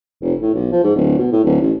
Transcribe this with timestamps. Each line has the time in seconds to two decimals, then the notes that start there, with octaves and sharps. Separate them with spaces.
0.21 F1
0.42 A2
0.54 B1
0.72 F3
0.84 G#2
0.96 D1
1.18 B2
1.32 A2
1.44 D1
1.61 A1